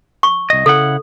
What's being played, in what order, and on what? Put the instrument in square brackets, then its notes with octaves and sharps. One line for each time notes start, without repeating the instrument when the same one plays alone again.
[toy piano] C#6
[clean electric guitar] C2 D#5
[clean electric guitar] C#3 E4 F#5 [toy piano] A4